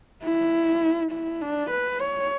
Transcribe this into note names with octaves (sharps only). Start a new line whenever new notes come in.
E4
E4
D4
B4
C#5